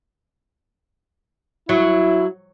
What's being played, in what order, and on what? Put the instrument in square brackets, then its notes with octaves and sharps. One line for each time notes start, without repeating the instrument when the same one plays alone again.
[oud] F#3 [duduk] E4